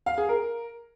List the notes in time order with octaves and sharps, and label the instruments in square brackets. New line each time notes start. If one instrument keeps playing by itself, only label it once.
[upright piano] F5
G#4
A#4